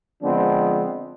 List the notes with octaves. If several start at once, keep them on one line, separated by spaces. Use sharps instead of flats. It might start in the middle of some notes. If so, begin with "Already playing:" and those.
D3 F3 G#3 B3 C4 D4